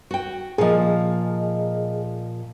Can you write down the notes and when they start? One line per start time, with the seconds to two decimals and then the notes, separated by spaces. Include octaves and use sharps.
0.11 F#4 G5
0.58 A#2 F3 G#4 D#5